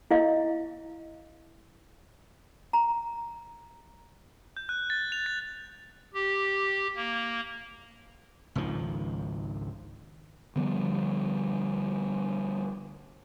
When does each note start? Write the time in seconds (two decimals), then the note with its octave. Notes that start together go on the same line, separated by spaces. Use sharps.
0.11 E4 D#5 F5
2.73 A#5
4.57 G6
4.69 F#6
4.90 A6
5.12 F7
5.26 A6
6.14 G4
6.96 A#3
8.55 G#1 C#2 D#3 F3
10.56 D3 F3 G3 B3